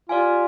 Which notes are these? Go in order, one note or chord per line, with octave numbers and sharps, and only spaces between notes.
F4 G4 D5 F5 G#5